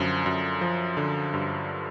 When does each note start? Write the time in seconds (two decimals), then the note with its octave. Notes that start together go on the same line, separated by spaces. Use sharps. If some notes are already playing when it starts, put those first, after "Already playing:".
Already playing: F#2 D3 F3
0.26 F#2
0.61 F3
0.97 D3
1.34 G2